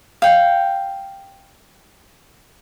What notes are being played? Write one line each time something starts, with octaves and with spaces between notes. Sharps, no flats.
F5 G5